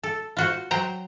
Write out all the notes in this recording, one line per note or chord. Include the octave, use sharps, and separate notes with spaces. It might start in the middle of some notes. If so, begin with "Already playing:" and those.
A4
F4 F#4 C5
F#3 C5 G5 A#5